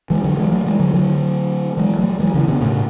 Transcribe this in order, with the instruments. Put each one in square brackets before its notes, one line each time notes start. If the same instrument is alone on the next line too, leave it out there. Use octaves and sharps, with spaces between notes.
[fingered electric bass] E3 G#3
D3 F#3
E3 G#3
F#3 A3
E3 G#3
D3 F#3
D3 F#3
E3 G#3
F#3 A3
E3 G#3
C#3 E3
B2 D3
A2 C#3